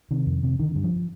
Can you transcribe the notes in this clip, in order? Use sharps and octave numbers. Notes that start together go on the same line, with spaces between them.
C3 D#3
F2
C3
D3 D#3
G2
F3